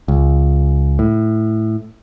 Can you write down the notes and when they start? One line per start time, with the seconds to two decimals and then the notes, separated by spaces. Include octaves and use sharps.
0.08 C#2
0.99 A2